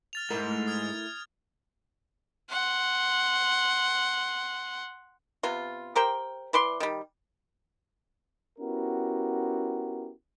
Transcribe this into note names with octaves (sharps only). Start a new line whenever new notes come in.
F6 A6 F7
G#2 A3 E4 A#4
D#6 F6 G#6
F#5 C6
C3 B3 F4
G4 A#4 C5 G5
E3 B4 D5 C6
D#3 G3
B3 C#4 E4 F#4 G4 A#4